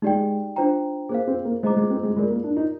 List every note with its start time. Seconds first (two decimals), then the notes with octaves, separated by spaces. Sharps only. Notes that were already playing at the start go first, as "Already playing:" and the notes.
0.02 G#3 D#4 G4 D5 G5
0.56 D4 F4 C5 G5 A#5
1.09 A#3 G#4 C5 F5
1.27 C4
1.45 A#3
1.63 G#3 C5 D#5 A#5 D6
1.77 G#3
1.90 C4
2.03 G#3
2.16 G#3 F4 A#4 D5
2.30 A#3
2.44 D4
2.56 D#4